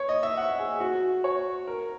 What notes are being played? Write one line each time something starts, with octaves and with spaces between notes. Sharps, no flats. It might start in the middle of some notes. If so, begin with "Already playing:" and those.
Already playing: C#5
D#5
E5
F#5
G#4
F#4
C#5
A#4